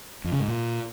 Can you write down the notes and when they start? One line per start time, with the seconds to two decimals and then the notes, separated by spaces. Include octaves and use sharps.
0.24 F2
0.32 C#3
0.40 G#2
0.48 A#2